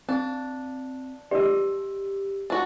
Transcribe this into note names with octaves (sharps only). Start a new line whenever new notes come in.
C4 D4
G4 D5 D#5 E6
D4 F#4